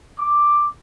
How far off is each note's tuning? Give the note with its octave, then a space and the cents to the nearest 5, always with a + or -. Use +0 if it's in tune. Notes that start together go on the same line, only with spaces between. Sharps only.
D6 +5